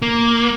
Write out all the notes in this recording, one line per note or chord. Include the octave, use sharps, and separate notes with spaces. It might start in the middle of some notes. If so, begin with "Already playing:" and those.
A#3